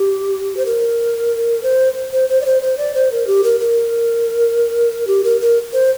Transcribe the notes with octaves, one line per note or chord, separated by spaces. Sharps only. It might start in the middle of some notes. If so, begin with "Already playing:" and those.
Already playing: G4
C5
A#4
C5
C5
C5
D5
C5
C5
D5
C5
A#4
G4
A#4
A#4
G4
A#4
A#4
C5